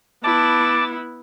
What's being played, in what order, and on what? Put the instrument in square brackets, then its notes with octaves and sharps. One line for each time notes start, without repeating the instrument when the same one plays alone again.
[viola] B3 E4 [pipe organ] A5 D6